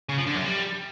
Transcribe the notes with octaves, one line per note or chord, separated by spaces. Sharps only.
C#3
F3
D3
F#2
G3